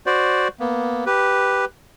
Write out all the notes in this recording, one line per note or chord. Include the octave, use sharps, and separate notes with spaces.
F#4 C5 D5
A#3 B3
G4 B4